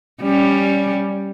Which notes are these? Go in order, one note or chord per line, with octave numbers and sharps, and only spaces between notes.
G3 C#4